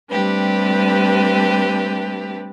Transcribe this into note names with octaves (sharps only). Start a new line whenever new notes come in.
G3 A3 C4 D4 G4 B4